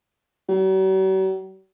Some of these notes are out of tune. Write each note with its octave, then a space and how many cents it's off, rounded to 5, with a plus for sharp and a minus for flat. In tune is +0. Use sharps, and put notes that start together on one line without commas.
F#3 +45